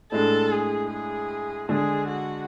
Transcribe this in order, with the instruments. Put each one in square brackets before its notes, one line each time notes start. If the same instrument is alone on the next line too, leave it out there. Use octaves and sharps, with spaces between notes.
[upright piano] A2 G#3 D4 [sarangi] A4
[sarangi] G#4
G#4
[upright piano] D3 G#3 D4 [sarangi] G#4
[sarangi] F#4